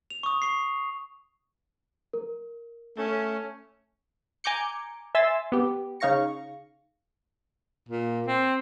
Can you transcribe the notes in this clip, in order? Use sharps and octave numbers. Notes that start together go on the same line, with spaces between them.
F7
C#6 D#6
C#6 C7
A#4
A3 C#4
G#5 A#5 D6 G6 C#7
E5 G#5 C6 E6 A6
B3 G4
C#3 D#4 F5 C#6 A#6 C#7
A#2
C4